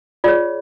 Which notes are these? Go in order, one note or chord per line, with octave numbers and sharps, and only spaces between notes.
F4 G#4 C#5 D5